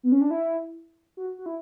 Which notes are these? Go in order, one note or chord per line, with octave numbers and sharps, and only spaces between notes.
B3
C#4
D4
E4
F#4
F#4
E4